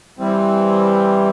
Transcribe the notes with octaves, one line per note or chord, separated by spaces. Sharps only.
E3 G3 C4